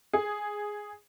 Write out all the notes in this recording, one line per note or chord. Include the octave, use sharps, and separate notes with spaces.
G#4